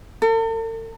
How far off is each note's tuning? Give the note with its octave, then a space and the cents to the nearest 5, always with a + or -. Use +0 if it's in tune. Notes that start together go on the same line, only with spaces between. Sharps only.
A4 +45